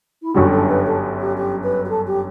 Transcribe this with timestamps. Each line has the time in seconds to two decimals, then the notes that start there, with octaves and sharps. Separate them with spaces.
0.23 E4
0.34 G1 F#2 D3 G3 F#4
0.53 A4
0.69 B4
0.87 A4
1.21 G4
1.37 G4
1.64 B4
1.85 G4
1.89 A4
2.07 G4